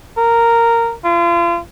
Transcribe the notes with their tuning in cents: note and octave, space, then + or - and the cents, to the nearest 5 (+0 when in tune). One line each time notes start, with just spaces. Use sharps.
A#4 -10
F4 -35